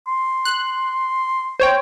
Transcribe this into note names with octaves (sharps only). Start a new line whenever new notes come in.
C6
F#6
C5 C#5 G5